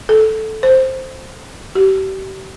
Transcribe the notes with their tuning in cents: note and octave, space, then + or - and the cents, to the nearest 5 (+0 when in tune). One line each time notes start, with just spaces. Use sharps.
A4 -5
C5 +5
G4 -35